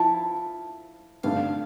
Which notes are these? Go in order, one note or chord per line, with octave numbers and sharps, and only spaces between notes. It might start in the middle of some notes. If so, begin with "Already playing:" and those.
Already playing: F3 E4 A5
G2 D3 A3 D4 F5